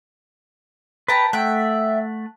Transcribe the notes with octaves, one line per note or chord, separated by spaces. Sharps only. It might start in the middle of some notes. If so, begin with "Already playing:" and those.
B4 G5 A5 A#5
A3 E5 F#5 G5